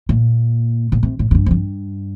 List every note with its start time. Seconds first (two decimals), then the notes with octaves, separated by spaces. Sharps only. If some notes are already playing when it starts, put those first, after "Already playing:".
0.09 A#2
0.92 A#2
1.03 C3
1.19 A2
1.31 A2
1.35 G2
1.46 F2
1.51 G2